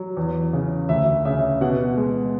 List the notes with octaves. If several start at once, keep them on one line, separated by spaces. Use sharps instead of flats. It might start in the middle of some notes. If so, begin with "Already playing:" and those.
Already playing: F#3
E2
C#3
D2 E5
C#3 E5
B2 F#5
G#3